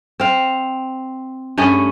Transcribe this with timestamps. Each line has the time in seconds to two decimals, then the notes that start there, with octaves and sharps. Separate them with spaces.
0.20 C4 F5
1.58 G2 A3 C#4 G#4